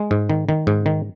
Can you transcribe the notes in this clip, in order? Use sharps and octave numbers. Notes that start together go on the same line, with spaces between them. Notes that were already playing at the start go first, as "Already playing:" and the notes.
Already playing: G#3
G#2
D#3
D#3
G#2
D#3